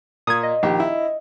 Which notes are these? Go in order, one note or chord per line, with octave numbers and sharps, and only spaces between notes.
A#2 D#6 G#6
D#5
A#1 D#3 G4
E4